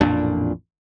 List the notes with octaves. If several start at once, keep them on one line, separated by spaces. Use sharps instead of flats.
A1 F2 A#2 D4